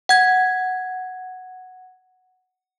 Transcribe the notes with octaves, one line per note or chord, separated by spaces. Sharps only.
F#5 G#6